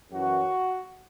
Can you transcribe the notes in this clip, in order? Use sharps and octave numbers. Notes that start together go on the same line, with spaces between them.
F#2 E3 F#4